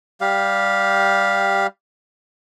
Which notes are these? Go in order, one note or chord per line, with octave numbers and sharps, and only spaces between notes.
G3 G4 F5